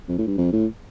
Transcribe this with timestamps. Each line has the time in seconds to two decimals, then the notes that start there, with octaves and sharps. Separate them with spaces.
0.08 F2
0.18 A2
0.27 G2
0.38 F2
0.53 A2